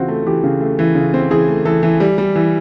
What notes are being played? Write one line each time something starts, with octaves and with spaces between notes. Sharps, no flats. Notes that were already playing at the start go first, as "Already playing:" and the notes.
Already playing: C#3 E3 C4 F4 F#4
A3
E3 G4
C#3
A3
E3
C#3
C4
E3 G#4
A3
E3 A4
E3
G3
G3
E3